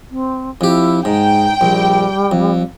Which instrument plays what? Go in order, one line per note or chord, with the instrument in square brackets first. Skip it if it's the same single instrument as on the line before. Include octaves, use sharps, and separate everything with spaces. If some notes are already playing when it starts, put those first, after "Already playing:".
[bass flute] C4
[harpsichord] F2 G4 [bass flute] E4
[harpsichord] G#2 [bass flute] D#4 [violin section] G5
[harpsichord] A#1 [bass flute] G3
[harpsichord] F2